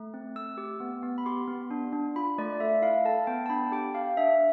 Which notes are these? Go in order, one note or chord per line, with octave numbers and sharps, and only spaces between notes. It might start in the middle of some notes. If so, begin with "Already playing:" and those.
Already playing: A3
C4
A3 E6
G4
B3
B3
B5
G4 C6
B3
D4
D4
F4 B5
A3 D5
A4 E5
E4 F5
A4 A5
B3 G5
A5
D4 B5
G4 G5
G4 F5
D4 E5